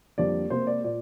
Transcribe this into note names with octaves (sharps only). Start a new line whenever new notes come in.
F2 D3 G3 A#3 D5
C3 A#3 C5
D5
A#2 D5